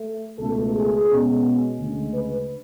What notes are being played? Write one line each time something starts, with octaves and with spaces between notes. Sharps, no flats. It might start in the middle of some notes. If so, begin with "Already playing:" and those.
Already playing: A3
C#2 B2 A3 A4
G#4
B2 G#3 C#4
D2 C#3 G#3
B4